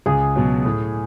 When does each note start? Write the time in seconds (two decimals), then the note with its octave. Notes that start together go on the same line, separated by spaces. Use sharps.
0.06 C#2 G#4
0.36 B2 F#3
0.65 A2